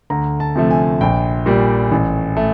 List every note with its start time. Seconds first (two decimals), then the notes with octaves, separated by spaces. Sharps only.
0.10 D2 A#5
0.40 A5
0.56 C3 F3 A3
0.71 G#5
1.01 A#1 G5
1.46 A#2 G3
1.91 A1
2.37 A3